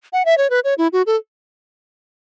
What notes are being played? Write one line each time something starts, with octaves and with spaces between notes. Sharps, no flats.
F#5
E5
C#5
B4
C#5
E4
F#4
A4